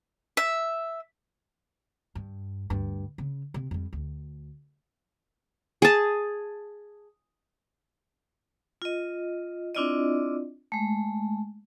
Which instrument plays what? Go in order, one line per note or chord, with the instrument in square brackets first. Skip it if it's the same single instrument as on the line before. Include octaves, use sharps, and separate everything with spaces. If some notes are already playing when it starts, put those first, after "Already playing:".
[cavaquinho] E5
[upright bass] G2
D2 G2
C#3
C3
F2 G3
D2
[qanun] G#4 A5
[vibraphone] F4 D#5
C4 D4 E4 F4 D5 D#5
G#3 A3